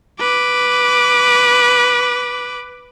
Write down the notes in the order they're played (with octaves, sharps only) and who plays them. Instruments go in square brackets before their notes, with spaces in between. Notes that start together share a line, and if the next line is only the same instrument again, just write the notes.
[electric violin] B4 D6